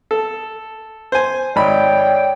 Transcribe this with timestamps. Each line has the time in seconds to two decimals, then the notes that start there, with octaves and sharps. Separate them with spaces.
0.11 A4
1.12 C5 G#5
1.56 G#1 C#5 D5 G5 B5